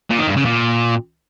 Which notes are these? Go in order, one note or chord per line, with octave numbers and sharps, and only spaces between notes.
A#2
D#3
G2
C#3
A#2